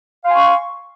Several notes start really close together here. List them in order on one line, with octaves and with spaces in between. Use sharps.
F5 C6 G#5 C#6